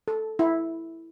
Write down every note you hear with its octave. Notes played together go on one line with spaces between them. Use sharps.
A4
E4